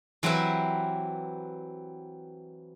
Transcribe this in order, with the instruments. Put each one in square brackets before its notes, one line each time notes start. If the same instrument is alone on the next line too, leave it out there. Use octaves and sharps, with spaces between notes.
[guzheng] E3 F#3 C4 G4 B4 E5